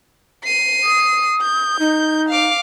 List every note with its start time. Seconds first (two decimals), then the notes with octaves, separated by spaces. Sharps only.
0.43 C7 D#7
0.83 D#6
1.42 G6
1.79 D#4
2.29 F5 D6